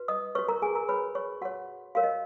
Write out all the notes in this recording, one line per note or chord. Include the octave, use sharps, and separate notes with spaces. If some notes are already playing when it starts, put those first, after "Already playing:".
Already playing: F#4 B4
D#5 D#6
F#4 B4 C#5 C#6
A#4 A#5
G#4 G#5
A#4 A#5
F#4 B4 C#5 B5
C#5 C#6
F#4 C#5 F#5
F#4 A#4 C#5 F5
D#5